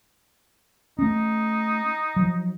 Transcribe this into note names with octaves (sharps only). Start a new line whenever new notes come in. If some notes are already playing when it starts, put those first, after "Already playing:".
A3 C#4 D#4
F3 F#3